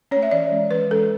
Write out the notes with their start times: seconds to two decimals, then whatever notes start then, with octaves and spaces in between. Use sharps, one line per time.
0.11 C#4 C#5
0.16 A3
0.23 E5
0.31 E3 D5
0.51 G#3 C#4
0.71 E3 B4
0.90 G#3 C#4 A4